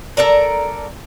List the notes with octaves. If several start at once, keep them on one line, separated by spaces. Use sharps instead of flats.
A4 A#4 D5 A#5